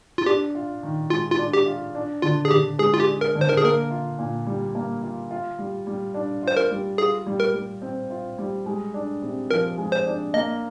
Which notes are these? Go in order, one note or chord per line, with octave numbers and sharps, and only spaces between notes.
F4
D4 G4
F4
D#3
G#3 F4
F4
D4
G4
F4
D4
D3 F4
G#4
D3 G4
G#3 G#4
F4
G4
D4
A#4
D3
C5
A#4
G#4
A#3 A#4
F4
A#2
G3
A#3
F4
F4
G3
G3
D4
F4 C5
A#4
G3
F4 G#4
G3
A#4
G3
C4
F4
G3
G#3
D4
C3
F3 A#4
G#3
C5
D4
A#3 D#5